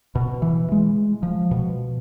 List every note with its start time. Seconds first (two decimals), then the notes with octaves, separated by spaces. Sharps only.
0.15 B2
0.42 E3
0.72 G#3
1.23 F3
1.51 B2